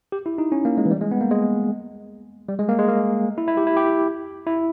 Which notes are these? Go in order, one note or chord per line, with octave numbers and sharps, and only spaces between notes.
G4
E4
D#4
C#4
A#3
G#3
E3
G3
G#3
B3
A#3
G#3
G3
G#3
A#3
G#3
A#3
E4
E4
G4
E4
G4
E4